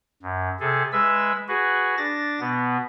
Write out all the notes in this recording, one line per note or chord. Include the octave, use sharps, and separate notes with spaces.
F#2
C3 G#4 A4
G#3 B4 E5 E6
F#4 G#4 B4
D4 A6 A#6
B2 B3